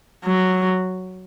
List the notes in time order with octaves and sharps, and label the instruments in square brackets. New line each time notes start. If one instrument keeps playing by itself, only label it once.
[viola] F#3